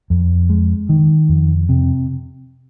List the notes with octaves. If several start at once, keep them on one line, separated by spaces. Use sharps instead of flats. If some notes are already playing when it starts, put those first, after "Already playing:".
F2
G#3
D#3
F2
C3